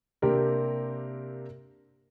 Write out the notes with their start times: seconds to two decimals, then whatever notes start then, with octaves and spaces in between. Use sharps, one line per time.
0.22 C3 A#3 C4 D4 G4 A#4